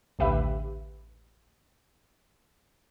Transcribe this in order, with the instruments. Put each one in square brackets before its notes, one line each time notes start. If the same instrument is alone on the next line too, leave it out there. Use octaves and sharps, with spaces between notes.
[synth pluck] A1 D2 D3 G4 B4 E5